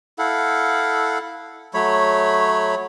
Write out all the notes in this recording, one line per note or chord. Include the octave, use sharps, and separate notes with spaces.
E4 A4 F5 F#5
F#3 A3 C#5 B5